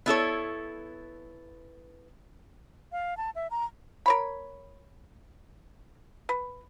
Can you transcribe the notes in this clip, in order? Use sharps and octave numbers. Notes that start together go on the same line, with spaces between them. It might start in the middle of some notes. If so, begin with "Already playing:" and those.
B3 E4 A4 C#5
F5
A5
E5
A#5
A#4 C#5 B5
B4